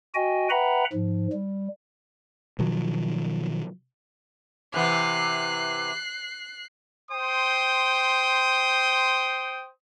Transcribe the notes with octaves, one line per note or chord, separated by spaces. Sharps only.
F#4 D#5 G5 G#5
B4 E5 F#5 G5 A#5 B5
G#2 F3
G3
B2 D#3 F3 F#3
C3 E3 B3 F#6 C7
C5 G5 C6 D#6